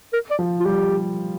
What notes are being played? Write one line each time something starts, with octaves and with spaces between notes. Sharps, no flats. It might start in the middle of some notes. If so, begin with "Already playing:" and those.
A#4
D5
F3
F4
G3 G4